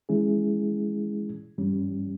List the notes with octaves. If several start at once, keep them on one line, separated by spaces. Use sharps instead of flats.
E3 G#3 C#4 E4 G#4
G2 E3 G3 C#4